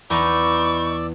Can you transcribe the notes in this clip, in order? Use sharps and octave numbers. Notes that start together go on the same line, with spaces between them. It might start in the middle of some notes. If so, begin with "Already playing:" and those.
E2 D#4 B4 D5 G#5 C#6 D6 E6